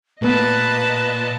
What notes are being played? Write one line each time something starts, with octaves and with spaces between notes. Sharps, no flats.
A#2 A3 B3 B4 D#5 A5